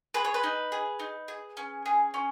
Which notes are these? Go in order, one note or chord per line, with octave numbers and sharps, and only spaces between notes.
G#4 B4
C#5
B4
D#4
G#4
D#4
G#4
C#4
G#4
C#4